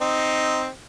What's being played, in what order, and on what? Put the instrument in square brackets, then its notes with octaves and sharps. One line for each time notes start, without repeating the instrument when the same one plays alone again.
[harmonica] C4 D#4